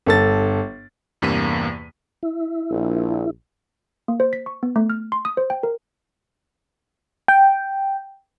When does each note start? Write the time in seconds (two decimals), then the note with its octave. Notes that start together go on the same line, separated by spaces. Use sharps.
0.06 G1 A4 A6
1.22 E2 G2 C3 A#3 B6 D#7
2.23 E4
2.71 A#1
4.08 A#3
4.20 C5
4.33 B6
4.46 C#6
4.63 B3
4.76 A3
4.90 F6
5.12 C6
5.25 D#6
5.37 C5
5.50 G5
5.63 A#4
7.28 G5